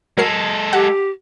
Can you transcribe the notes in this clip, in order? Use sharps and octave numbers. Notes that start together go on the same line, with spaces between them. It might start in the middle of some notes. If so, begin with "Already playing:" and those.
F#3 G#3 A4 A#4 C7
G4 F#5